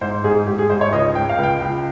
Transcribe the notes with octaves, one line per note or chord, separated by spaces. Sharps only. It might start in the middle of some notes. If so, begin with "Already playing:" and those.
G#2 C5
G#2 G#4
G#2 G4
G#4
G#2 C5
C#5
C#2 D#5
G#3 G5
F5
C#2
G5
C#2